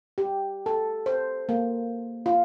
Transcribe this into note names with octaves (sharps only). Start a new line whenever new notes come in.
G4
A4
C5
A#3
F4